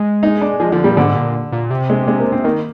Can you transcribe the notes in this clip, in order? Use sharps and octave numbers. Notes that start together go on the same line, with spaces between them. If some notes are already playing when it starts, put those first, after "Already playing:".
Already playing: G#3
D#4
D4
F3 G#3
D3 F3
A#2 G3
G#2 D3
A#2
A#2
C3
G#3
G#3
A#3
C4
D#3 A#3